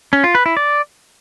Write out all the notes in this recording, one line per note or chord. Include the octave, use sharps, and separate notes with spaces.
C#4
F4
B4
E4
D5